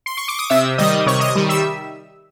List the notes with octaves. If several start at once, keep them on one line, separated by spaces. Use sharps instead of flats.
C6
C#6
D6
D#6
C3 E5 E6
D#3 G3 D#5 D#6
C3 C#5 C#6
D#5 D#6
D#3 G3
E5 E6